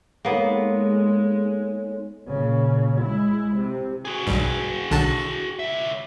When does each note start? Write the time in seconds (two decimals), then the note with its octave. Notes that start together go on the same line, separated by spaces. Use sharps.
0.25 G#3 A#3 B3 D#4 A4 C#5
2.28 A#2 C#3
3.01 G#3 E4
3.57 C3
4.05 F#4 G#4
4.27 B1 G2
4.91 B1 D3 A5
5.59 C#3 E5